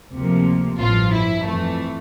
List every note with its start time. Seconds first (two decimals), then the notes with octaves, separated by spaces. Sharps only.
0.14 D2 C3 F3 A#3
0.80 A1 G2 F3 F4
1.13 E4
1.47 F2 E3 A3